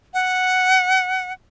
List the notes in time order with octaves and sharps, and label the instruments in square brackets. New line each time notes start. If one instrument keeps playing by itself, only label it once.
[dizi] F#5